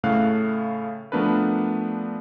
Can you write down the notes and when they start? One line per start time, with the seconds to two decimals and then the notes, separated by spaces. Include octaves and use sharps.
0.04 A2 C#3 A3 F5 F#6
1.12 F3 A3 B3 D4 A#4 B4